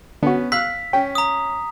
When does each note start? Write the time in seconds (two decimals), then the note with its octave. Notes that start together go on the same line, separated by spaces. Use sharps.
0.23 D3 B3 C#4 F#4
0.52 F5 E6 F#6 B6
0.93 C#4 G5
1.15 A#5 D#6